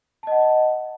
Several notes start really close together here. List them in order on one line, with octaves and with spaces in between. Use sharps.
A5 D#5 F#5